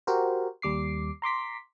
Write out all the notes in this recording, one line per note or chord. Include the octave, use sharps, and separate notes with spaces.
F#4 G4 A#4 C5
D#2 G3 D6 C7
A#5 C6 D6 B6